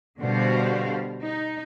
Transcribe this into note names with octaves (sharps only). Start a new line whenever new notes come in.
B2 D3 G3 F#4 C5 F5
D#4